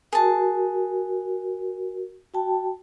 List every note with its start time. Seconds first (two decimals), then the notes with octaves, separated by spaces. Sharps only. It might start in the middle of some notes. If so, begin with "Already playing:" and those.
0.13 F#4 G#4 A#4 A5
2.34 F#4 G5 A5